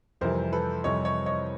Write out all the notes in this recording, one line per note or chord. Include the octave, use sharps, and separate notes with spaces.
F2 C3 E3 G3 A#4 C5
A4 B4
F2 C3 E3 G3 C#5 D#5
C#5 D#5
C#5 D#5